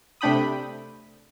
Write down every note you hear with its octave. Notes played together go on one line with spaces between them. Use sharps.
C3 A3 D4 G5 B5 D#6